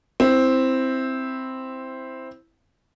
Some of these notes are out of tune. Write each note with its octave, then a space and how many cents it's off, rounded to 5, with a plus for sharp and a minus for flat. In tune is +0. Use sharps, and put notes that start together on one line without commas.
C4 +0 E4 +0